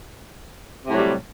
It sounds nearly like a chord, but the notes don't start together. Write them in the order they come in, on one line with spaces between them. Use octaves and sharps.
C3 A2 F#3 G3